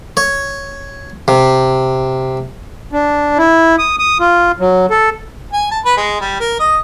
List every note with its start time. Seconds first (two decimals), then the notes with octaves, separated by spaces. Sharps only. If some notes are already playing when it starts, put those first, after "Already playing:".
0.17 C#5
1.28 C3
2.92 D4
3.38 E4
3.79 D#6
3.99 D#6
4.20 F4
4.60 F#3
4.91 A4
5.53 G#5
5.71 A5
5.85 B4
5.97 G#3
6.21 G3
6.40 A#4
6.59 D#5